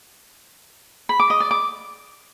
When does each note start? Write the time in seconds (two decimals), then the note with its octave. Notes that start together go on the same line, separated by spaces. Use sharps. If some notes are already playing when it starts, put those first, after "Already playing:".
1.09 B5
1.20 D6
1.30 D#5
1.40 D5
1.51 D6